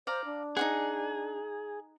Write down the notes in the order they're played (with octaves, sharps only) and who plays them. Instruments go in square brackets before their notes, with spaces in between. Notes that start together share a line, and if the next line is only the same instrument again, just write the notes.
[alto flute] C5 [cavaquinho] D5 F5 A#5
[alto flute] D4
[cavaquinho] D#4 F4 F#5 [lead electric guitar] G#4